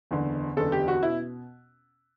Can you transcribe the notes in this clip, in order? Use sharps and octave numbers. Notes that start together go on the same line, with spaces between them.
F#1 E2 D3
F#1 E2 D3 A4
G4
F#4
B2 E4